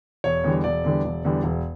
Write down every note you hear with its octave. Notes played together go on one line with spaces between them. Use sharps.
E1 C#5
E2 D3 G3
E1 D5
E2 D3 G3
E1
E2 D3 G3
E1